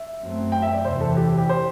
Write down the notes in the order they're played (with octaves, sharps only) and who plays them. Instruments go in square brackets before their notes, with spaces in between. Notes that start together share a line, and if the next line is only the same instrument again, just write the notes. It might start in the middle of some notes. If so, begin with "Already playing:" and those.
Already playing: [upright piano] E5
[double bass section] F#2 F#3 A3 C4
[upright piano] G5
E5
D5
[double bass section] E2 C3 E3 [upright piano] C5
[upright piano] A4
G4
G4
C5